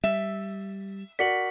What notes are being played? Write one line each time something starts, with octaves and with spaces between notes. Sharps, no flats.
G3 E5
F#4 A#4 D5 B6 C#7 F#7